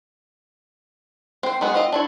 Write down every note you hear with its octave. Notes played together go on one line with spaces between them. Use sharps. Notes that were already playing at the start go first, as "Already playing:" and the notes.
C4 C5
F#3 G#3 B3
C4 F4 D#5
D4 E4 C#5